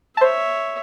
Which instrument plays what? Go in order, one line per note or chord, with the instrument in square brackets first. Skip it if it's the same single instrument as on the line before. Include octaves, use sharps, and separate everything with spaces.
[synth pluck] C5 A5 [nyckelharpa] C#5 E5